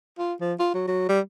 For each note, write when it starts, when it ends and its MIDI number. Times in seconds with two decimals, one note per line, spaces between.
0.18 0.33 65
0.41 0.54 53
0.59 0.70 65
0.74 0.83 54
0.88 1.06 54
1.09 1.20 55